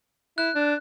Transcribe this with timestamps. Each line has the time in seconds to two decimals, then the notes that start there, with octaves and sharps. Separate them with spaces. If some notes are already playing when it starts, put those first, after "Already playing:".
0.38 E4 F#6
0.55 D4